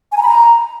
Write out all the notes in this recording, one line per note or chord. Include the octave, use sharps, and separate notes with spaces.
G#5
A#5
B5
A#5